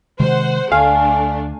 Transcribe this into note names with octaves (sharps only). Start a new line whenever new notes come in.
C3 D#3 G#3 C5 F#5
D2 A3 D4 F5 G#5